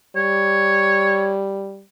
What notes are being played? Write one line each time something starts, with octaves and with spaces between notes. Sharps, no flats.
G3 C#5